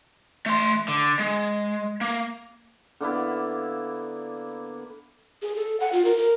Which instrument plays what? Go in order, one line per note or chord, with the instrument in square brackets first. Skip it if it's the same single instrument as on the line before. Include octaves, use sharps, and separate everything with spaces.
[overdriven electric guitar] A3 C6
D3
G#3
A#3
[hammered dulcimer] D3 A#3 B3 E4
[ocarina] G#4
A4
F#5
F4
A#4
A#4